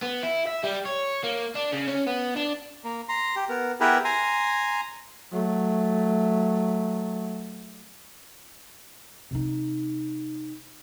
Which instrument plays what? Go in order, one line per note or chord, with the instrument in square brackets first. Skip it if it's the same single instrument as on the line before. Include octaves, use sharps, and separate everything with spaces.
[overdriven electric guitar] B3
E4
E5
G3
C#5
A#3
D4
C#3
C#4
B3
D4
[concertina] A#3
A#5 C6
G4
B3 A#4
B3 E4 G4 G#4 A#4 B4
G#5 A#5 C6
[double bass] F#3 A3
[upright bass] C3 D#4